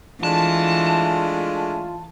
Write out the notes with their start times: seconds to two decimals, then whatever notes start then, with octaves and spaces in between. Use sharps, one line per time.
0.23 E3 G#3 A3 D4 F4 A5